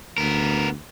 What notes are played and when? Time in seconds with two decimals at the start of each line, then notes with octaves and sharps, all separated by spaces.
0.18 D2 B3 A#4